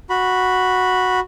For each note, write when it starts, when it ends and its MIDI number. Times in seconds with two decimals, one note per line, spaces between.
0.10 1.20 66
0.10 1.20 83